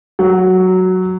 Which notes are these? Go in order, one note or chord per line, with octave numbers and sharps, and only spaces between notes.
F#3